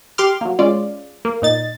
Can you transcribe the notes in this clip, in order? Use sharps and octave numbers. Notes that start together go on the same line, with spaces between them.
G4 C6 D6 F6
F#3 A#3
G#3 C#4 F4 D5
A#3
A#2 D#4 A6